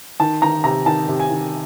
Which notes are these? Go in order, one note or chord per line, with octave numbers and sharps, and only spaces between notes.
D#3 A5
D#3 A#5
C3 A#5
D#3 A5
C3
G#5
D#3